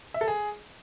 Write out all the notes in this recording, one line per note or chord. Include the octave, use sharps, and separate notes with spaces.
E5
A4
G#4